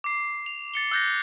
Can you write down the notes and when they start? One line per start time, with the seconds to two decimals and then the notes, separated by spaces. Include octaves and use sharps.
0.04 D6 C7
0.46 F7
0.74 A6 C#7 G7
0.91 E6 F#6 G6 A6 A#6